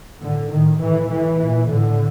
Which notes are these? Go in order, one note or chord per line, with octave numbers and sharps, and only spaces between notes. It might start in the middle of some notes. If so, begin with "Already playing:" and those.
A2 D3
A2 D#3
A2 E3
A2 E3
A#2
A2 D3